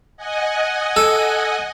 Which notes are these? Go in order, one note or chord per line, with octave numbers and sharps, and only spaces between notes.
D#5 F#5 G#5
A4